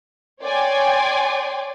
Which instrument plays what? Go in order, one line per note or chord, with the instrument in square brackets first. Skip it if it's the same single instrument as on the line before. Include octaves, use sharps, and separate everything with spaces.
[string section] C#5 D5 G5 G#5 C6